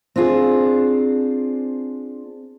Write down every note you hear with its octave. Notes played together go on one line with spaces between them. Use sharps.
C4 D4 F4 G#4